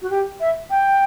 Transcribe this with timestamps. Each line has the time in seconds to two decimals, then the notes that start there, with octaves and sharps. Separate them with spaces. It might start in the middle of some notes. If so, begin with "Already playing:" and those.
0.02 F#4
0.10 G4
0.40 E5
0.70 G5